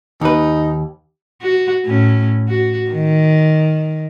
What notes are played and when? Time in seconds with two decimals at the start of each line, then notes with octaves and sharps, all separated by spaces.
0.21 D#2 D#4 B4
1.42 F#4
1.86 A2 C#4
2.49 F#4
2.90 D#3